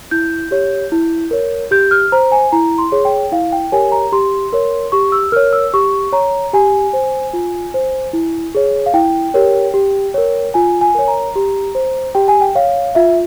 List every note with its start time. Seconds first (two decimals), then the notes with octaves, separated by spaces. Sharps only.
0.11 E4 G6
0.51 G4 C#5
0.92 E4
1.31 A#4 C#5
1.71 G4 G6
1.91 F6
2.12 C5 A#5
2.32 G#5
2.52 E4 A#5
2.78 C6
2.92 G#4 C#5
3.05 G5
3.32 E4 F5
3.52 G5
3.72 G4 A#4 C#5 G#5
3.92 A#5
4.12 G4 C6
4.53 A#4 C#5
4.92 G4 C#6
5.12 E6
5.32 A#4 C#5 F6
5.53 E6
5.74 G4 C#6
6.13 C#5 A#5
6.53 G4 G#5
6.93 C5
7.33 F4
7.74 C5
8.13 E4
8.55 G#4 C#5
8.86 F5
8.94 E4 G5
9.34 G4 A#4 C#5
9.74 G4
10.14 A#4 C#5
10.54 F4 G#5
10.81 G#5
10.95 A#4 C#5
11.08 A#5
11.36 G4
11.75 C5
12.15 G4 G5
12.28 G#5
12.41 G5
12.55 C#5 F5
12.95 F4 E5